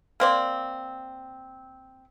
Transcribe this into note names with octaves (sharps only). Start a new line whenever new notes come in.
A#3 C4 D5